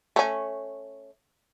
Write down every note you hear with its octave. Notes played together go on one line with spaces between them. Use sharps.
A3 C#4